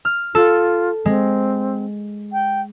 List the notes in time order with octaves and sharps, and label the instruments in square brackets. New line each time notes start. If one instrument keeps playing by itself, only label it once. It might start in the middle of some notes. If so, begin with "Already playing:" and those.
[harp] F6
[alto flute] F4 [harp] A4
[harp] G#3 [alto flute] C4
[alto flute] G5